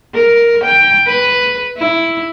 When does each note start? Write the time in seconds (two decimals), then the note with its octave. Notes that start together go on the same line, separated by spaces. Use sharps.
0.15 A#4
0.64 G5
1.07 B4
1.77 E4